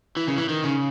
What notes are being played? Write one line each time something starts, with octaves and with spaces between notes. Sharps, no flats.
E3
C#3
E3
D#3
C#3